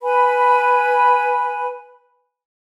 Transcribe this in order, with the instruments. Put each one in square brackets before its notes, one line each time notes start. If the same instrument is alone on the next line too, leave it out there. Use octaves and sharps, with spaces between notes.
[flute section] B4 G#5 B5